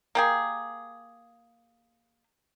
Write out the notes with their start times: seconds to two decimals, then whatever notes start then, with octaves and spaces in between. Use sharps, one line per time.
0.15 A#3 G4 G#4